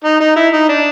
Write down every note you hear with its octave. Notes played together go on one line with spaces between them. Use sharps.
D#4
D#4
E4
D#4
D4